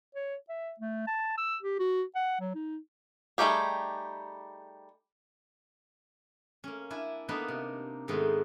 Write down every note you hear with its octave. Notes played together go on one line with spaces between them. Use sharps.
C#5
E5
A3
A5
E6
G4
F#4
F#5
F#3
D#4
G3 A3 D#4 G4 G#4
A#3 C#4
D4 E4 G#5
A#3 B3 D4 D#4 B4
C3
G#2 D#3 G#3 A3 B3 C4